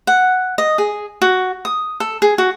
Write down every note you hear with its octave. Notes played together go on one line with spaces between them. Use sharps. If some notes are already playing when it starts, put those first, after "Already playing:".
F#5
D#5
G#4
F#4
D#6
A4
G#4
F#4